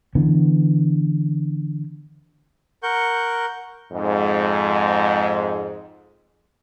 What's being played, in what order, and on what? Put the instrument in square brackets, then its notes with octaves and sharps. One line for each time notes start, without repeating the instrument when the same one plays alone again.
[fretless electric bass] D3 E3 B3
[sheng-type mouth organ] A#4 F#5 C#6 G6
[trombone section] F2 G#2